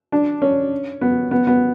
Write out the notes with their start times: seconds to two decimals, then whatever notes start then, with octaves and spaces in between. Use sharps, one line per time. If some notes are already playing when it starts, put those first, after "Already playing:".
0.12 D4
0.42 C#4
1.01 B3
1.31 B3
1.47 B3